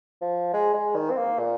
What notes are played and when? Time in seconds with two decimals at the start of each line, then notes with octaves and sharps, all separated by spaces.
0.21 F3
0.53 G#3
0.74 G#3
0.96 D#3
1.11 C4
1.17 A#3
1.39 A#2